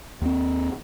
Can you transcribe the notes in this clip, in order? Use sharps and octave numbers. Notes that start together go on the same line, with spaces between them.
D#2 C4